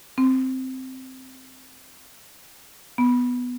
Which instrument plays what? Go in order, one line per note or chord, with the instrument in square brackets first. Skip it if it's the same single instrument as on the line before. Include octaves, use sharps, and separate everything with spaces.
[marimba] C4
B3